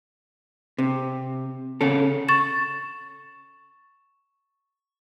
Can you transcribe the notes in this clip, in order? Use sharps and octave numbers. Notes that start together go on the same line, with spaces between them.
C3
C#3 C#4 A4
C#6 A6 E7